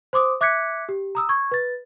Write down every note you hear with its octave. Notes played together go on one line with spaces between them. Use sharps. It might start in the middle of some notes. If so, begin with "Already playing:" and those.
C5 C6 D6 D#6
E5 D6 F#6 G#6 B6 C#7
G4
A#5 D#6 E6
C#6 G#6
B4 A6